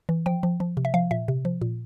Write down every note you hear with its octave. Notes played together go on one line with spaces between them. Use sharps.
E3
F3 G5
F3
F3
C3
E5
F3 F5
A#2 E5
C3
F3
A#2